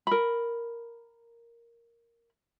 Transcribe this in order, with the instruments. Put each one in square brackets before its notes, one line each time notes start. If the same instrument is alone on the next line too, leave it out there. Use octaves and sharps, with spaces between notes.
[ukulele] A#4 B5